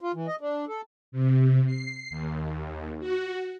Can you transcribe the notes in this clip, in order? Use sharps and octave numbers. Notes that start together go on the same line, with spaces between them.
F4
E3
D#5
D4
A4
C3
C7
D#2
F#4